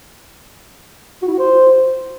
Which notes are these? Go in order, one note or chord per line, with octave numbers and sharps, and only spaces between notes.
F#4
E4
F#4
C5